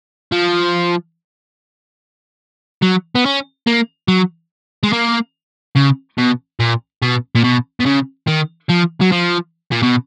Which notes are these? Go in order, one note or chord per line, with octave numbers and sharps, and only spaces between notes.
F3
F#3
B3
C#4
A#3
F#3
G#3
A#3
C#3
B2
A#2
B2
A#2
B2
B2
C#3
D#3
F3
F#3
F3
A#2
B2